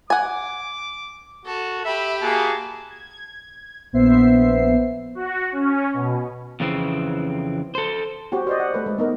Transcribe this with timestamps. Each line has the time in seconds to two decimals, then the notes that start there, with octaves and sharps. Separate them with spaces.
0.10 F#5 G#5 D6
1.46 F#4 A4
1.85 G4 E5 B5
2.22 A#3 F#4 G#4 A5
2.90 G#6
3.93 A#1 B3 C5 E5 C7
5.15 F#4
5.52 C#4
5.93 B2
6.60 F2 C#3 E3 C4
7.75 A4 C5
8.32 C4 F#4 G4
8.47 C5 D5 D#5
8.60 F#5
8.74 A3 B4
8.86 G#3
8.98 B3 D#4 A#4